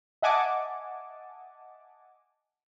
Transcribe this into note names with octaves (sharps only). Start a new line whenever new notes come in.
D#5 E5 F#5 G#5 A5 D6